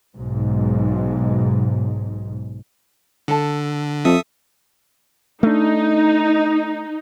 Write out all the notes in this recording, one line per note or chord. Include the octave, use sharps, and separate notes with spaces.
B1 G#2
D3 A4 A5
F2 A4 E5 D#6
A3 D4 D#4